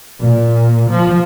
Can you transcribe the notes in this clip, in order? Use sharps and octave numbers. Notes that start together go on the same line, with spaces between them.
A#2
F3